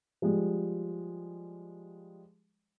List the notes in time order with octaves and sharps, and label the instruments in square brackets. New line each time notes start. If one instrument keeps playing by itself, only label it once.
[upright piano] F3 G3 G#3